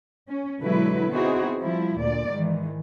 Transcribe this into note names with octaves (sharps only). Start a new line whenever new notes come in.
C#4
B2 D3 F#3 G#3 E4 B4
B3 C4 D#4 E4 F#4 G#4
F3 G3 E4
D2 A#2 D5
G#2 D#3 E3